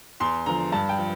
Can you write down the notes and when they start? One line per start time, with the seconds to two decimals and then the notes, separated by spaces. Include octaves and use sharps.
0.20 E2 C6
0.46 D3 F3 A#5
0.72 G2 A5
0.89 G5
0.99 F3